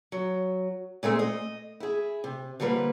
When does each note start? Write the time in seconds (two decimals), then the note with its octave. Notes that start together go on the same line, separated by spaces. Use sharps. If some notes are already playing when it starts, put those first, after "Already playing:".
0.12 F#3
1.03 A#2 G#3 A3 C4
1.19 D#5
1.80 E4 G#4
2.24 C3
2.60 D3 F3 G3 A#3 B4